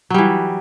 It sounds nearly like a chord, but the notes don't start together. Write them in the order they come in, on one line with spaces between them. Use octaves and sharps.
F#3 G3 E3